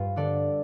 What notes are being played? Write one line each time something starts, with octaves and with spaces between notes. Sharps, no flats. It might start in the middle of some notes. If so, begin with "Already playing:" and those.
Already playing: G2 F4
D3 A4 D5